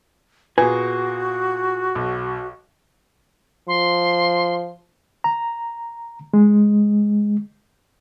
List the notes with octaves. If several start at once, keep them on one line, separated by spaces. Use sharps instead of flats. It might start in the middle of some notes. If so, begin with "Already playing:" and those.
A#2 B3 F#4 G#4 B4 G#5
B1
F3 C6
A#5
G#3